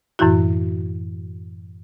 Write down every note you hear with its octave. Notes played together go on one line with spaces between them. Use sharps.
F#2 A2 E3 E4 F#4